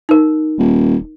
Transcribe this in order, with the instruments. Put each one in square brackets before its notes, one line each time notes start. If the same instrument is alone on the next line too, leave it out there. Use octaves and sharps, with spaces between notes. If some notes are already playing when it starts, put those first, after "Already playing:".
[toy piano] D#4 A#4
[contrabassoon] D#1